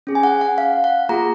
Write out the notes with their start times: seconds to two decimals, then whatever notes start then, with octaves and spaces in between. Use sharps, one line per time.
0.07 C#4 G#4
0.15 G#5
0.23 F#5
0.41 F#5
0.58 F5
0.84 F#5
1.09 A#3 F4 G#4 A#5